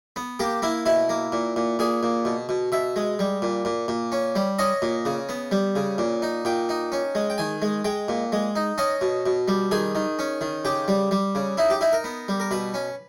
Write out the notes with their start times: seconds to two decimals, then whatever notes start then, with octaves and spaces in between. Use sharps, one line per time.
0.16 B3
0.39 A#3 G4
0.62 A#3 E4
0.86 B2 E4
1.09 A#3
1.32 A#2
1.56 A#2
1.79 A#2 G#4
2.03 A#2
2.25 B2
2.49 B2
2.72 B2 E5
2.96 G#3
3.19 G3
3.42 A#2
3.65 A#2
3.88 A#2
4.12 C#4
4.35 G3
4.59 C#4 D#5
4.82 A#2
5.05 C#3
5.29 B3
5.51 G3
5.76 C#3
5.98 A#2
6.22 D#4
6.45 A#2 G5
6.69 D#4
6.92 C#4
7.15 G#3
7.30 G5
7.38 D#3 G#5
7.62 G#3
7.85 G#3 G5
8.08 A#2
8.32 G#3
8.56 D#4
8.78 C#4 D#5
9.01 B2
9.26 B2
9.48 G3
9.71 D#3 G#4
9.95 D#3
10.19 C#4
10.41 D#3
10.65 C#3 G4
10.88 G3
11.11 G3
11.35 C#3
11.57 D#4 E4
11.70 G4
11.81 D#4 E4
11.93 A#4
12.04 B3
12.28 G3
12.40 A#4
12.51 B2 B4
12.74 C#4